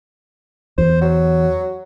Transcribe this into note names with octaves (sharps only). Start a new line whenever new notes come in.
E2 C5
F#3